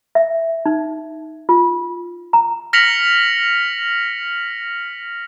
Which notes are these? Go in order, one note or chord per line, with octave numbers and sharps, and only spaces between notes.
E5
D#4
F4
A#5
F6 A#6 B6 C#7 F7 F#7